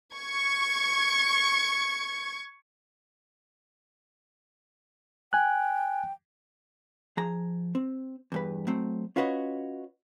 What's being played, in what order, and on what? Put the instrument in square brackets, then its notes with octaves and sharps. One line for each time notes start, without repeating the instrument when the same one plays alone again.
[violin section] C#6 G#6
[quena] G5 [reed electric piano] G#5 F#6
[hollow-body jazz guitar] F3 G#4 A#5
C4
E2 G2 B4
F#3 A3 C4
C#4 F4 F#4 B4 C#5 D#5